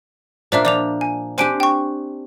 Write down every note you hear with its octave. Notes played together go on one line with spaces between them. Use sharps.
A#2 A#3 D4 C5 D5 E5
F3 D5 D6 F7
G#5
C4 D4 G4 C5 G#5 D7
G5 C#6